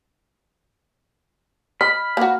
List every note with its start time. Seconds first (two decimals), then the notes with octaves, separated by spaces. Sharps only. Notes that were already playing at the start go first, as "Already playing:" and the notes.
1.81 D#5 B5 F6
2.17 A#3 F#4